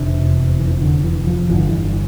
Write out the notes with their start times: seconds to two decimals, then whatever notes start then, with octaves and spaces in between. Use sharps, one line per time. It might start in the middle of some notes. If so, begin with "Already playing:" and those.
Already playing: F1 E2 C3 D4
0.59 E3
0.82 D3
1.04 E3
1.27 F3
1.49 G1 G2 D3 E3
1.71 E3